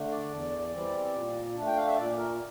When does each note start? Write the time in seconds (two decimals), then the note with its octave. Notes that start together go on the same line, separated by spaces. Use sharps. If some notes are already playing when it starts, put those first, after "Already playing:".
Already playing: D3 A3 D4
0.11 D5
0.31 E2
0.73 E3 G3 C4
1.14 A#2
1.56 A3 D4
1.67 G5
1.76 F5
1.87 E5
1.97 A#2 D5
2.18 A#4